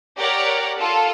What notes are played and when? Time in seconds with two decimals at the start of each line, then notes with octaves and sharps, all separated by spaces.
0.18 G4 A#4 C#5 D5 F#5
0.79 F4 A4